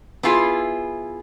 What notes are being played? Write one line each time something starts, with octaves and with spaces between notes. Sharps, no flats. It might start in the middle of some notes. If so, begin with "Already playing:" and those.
B3 E4 F4 G#4